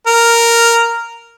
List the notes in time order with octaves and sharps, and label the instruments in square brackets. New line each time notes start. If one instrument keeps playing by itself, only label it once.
[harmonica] A#4